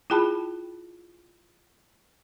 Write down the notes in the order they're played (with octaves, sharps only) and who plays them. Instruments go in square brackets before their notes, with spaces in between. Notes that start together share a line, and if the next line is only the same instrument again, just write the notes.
[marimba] E4 F4 G#4 G5 A5 B5